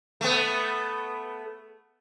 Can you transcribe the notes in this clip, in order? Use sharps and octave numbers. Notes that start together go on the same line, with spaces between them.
A3 B3